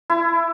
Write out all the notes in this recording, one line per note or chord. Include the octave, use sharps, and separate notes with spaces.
E4